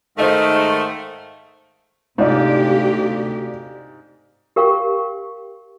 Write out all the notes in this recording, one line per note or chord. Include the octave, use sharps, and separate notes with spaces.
G#2 D#3 A3 C5 D#5 F5
D2 G#2 C3 F4 G4 D5 F5
G4 A#4 F5 G5 C#6